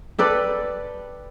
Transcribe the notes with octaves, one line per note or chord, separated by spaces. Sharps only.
G4 A4 B4 D5